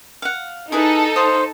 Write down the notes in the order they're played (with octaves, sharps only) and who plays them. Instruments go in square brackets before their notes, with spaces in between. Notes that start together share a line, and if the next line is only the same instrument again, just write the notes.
[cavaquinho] F5 F#5
[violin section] D#4 A4 [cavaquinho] E4 G#4 B4
[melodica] C5 [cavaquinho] F5 D#6